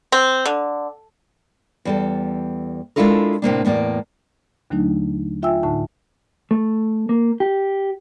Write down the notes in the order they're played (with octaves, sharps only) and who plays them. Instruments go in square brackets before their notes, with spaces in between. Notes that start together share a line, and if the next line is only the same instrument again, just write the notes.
[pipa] C4
D3
[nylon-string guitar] E2 G3 A4
G#3 D4 E4 F4 A4 A#4
A2 C3 A#3 D4
E2 A2 A#3 D5
[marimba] D#2 D3 F#3 A3 D4 D#4
F4 E5 G5 G#5 E6
D2 A2 D3 D#4 A5
[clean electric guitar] A3
A#3
G4